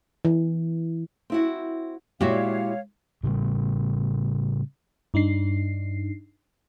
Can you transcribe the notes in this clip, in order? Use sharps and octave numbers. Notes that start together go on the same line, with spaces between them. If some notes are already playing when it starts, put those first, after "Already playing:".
E3
C4 E4 F#4
A#2 G#3 E4 F#4 G4 C#5 E5 F5
A2 C#3 G3
G2 D4 D#4 C7